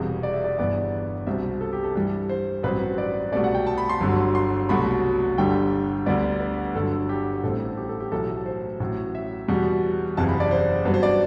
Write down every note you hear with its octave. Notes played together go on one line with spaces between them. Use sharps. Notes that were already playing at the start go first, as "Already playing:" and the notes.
Already playing: E1 E2 C3 G3
D5
E5
D5
G1 G2 E3 B3 D5
C2 B2 G3 C4 E5
A4
G4
A4
G2 E3 G3
C5
A1 G2 F#3 C4 B4
D5
C2 B2 A3 D5
F#5
G5
A5
B5
C6
G1 G2 D3 F#3
C6
C2 B2 F#3 A3 B5
G1 G2 D3 G3 G5
D2 D3 G3 B3 D5
B4
G1 G2 D3 F#3 A4
G4
A1 A2 G3 C4 A4
G4
A4
G4
B1 A2 E3 A3 A4
C5
A1 A2 F#3
E5
E2 B2 G3 F#5
F#1 E2 C3 E3 A5
B5
D5
C5
G2 F#3 B3 B4
C5
D5